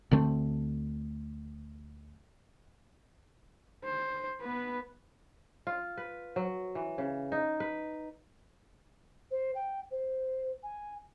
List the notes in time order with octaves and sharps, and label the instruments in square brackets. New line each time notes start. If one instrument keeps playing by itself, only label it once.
[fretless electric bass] D2 D3 A3 C4
[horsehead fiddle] C5
B3 B4
[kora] F4
B4
F#3
E3
C#3
D#4
B4
[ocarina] C5
G5
C5
G#5